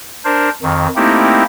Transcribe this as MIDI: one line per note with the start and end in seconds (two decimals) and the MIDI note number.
0.25 0.50 62
0.25 0.50 70
0.25 0.50 72
0.62 0.87 41
0.62 0.87 51
0.96 1.43 57
0.96 1.43 58
0.96 1.43 60
0.96 1.43 63
0.96 1.43 64
0.96 1.43 67